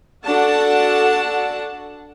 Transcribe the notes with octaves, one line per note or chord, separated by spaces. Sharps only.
D4 F#4 A4 F#5 A5